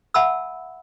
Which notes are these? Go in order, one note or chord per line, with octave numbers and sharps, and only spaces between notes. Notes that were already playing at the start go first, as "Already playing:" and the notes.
E5 F#5 A5 B5 E6